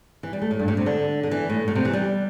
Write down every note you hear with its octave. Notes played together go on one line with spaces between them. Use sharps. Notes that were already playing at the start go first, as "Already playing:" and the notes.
E3
G3
A3
A2
G2
A2
C3
D3
D3
E3
A2
A2
C3
E3
G3